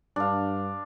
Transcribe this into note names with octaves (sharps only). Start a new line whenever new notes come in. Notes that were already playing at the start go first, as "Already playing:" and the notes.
G2 D4 F5